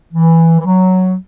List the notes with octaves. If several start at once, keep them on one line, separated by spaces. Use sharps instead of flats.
E3
E3
F#3